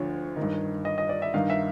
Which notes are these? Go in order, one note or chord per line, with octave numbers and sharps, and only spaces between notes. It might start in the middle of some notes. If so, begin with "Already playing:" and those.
Already playing: D2 D3 F3 C#5
D#3
G2
D#5
D#5
D5
E5
G2 D#3 F5
E5